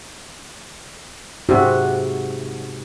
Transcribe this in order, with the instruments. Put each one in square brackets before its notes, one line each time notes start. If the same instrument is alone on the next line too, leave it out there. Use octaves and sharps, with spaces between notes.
[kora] G#2 C3 [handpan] F#4